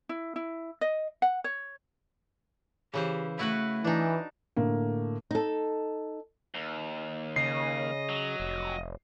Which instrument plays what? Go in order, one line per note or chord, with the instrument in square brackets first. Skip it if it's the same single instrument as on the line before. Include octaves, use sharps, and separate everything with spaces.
[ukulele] E4
E4
D#5
F#5
C#5
[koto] C#3 E3 C5 [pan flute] G4
[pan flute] A3 [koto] E4 F#4 B4
[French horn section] E3 [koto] D4 D#4
[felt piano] A2 D3 A#3
[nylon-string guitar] D#4 A4
[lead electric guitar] D#2
[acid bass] C#3 [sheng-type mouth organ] D#5 [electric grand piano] C7
[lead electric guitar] F#3
[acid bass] F1